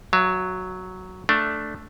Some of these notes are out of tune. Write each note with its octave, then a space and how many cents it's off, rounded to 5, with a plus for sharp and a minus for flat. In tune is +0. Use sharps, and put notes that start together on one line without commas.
F#3 +0 E5 +45
A3 +0 D4 +0